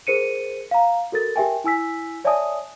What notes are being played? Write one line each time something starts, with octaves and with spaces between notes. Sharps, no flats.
G#4 A#4 C5 C#7 D#7
F5 A#5
F#4 A4 A#4 A6
G4 A#4 E5 G5 G#5
E4 G#5 E6 B6
C#5 D5 E5 G#5 A5 D#6